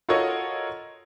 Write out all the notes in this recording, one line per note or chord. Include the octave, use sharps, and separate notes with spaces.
F4 F#4 A4 A#4 C#5 D#5